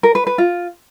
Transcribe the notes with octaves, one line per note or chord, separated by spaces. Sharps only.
A#4
B4
B4
F4